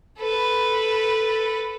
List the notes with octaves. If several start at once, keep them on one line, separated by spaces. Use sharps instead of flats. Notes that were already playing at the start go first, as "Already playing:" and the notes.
A4 B4